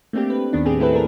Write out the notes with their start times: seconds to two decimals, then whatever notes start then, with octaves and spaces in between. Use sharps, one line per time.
0.13 A3 A#3 C4 D4 G4
0.30 B4
0.53 D#2 D#3 B3 D4
0.65 A2 C4 G4 G#4
0.80 A3 C4 E4 G#4 A4 B4
0.93 D4 G#4 A#4